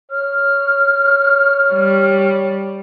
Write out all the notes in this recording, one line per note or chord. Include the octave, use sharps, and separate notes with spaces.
C#5 F6
G3